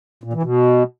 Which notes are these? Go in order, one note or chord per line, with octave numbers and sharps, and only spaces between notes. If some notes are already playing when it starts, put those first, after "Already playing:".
A#2
E3
B2